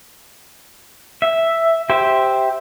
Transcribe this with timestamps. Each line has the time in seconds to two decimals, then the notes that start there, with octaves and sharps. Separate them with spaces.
1.22 E5
1.90 G4 C5 E5